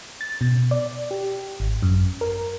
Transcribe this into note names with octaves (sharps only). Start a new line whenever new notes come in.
A6
B2
D5
G4
G#1
F#2
A#4